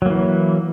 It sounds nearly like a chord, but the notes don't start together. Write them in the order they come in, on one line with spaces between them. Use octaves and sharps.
F#3 A#3 E3